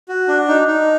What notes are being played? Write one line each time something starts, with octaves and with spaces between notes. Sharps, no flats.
F#4
D4
D#4
D#4